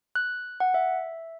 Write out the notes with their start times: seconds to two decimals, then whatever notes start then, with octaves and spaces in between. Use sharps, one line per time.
0.15 F#6
0.60 F#5
0.74 E5